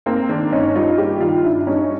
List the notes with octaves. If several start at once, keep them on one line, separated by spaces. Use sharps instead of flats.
A#3 C4
D#3 C4 D4
G2 C#4 D#4
G3 D#4 F4
A#3 F4 G4
D#3 D#4 F4
G2 D4 E4
G3 C#4 D#4